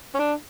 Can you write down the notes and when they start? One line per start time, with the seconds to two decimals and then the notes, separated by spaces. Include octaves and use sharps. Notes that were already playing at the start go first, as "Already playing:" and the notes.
0.14 C#4
0.19 D4